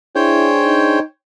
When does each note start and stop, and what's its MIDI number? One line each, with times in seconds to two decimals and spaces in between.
0.16 1.00 62
0.16 0.50 64
0.16 1.00 68
0.16 0.99 72
0.16 0.99 73
0.16 0.99 79
0.65 1.02 63